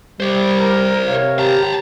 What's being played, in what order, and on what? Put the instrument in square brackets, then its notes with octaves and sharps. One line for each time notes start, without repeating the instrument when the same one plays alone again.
[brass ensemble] G3 [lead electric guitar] C5 D5
[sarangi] A#4
[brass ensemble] C3 A#4 F5 [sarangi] C#5
[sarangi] G4 [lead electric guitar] A5 A#5